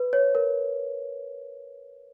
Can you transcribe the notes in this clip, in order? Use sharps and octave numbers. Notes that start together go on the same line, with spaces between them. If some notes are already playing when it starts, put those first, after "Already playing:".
Already playing: B4
C#5
A#4